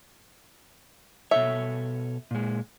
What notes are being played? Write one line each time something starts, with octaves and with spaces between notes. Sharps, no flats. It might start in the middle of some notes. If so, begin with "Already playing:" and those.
B2 A4 C#5 E5
A#2 G#3